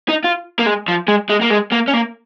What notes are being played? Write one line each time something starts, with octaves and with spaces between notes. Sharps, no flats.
D#4
F4
A#3
G#3
F3
G#3
G#3
A#3
G#3
A#3
C#4
A#3